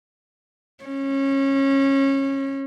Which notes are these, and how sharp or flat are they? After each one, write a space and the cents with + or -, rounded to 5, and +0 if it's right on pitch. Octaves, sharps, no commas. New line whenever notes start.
C#4 -25